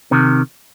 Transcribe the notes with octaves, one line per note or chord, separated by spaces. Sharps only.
C3 D#3